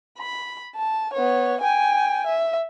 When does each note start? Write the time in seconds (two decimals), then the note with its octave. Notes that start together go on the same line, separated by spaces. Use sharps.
0.18 B5
0.76 A5
1.13 B3 C#5
1.62 G5 G#5
2.27 E5